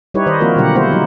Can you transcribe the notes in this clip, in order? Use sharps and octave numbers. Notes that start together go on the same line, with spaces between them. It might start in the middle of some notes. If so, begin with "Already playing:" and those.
G3 D#4 E4 G4 B4 C#5
D#3 C5 D#5
F3 A#3 C4 F4 F#4 A#4
B2 D3 F#3 G4 F#5
G#3 A#3 E4 C5 F#5
F#3 G3 D#4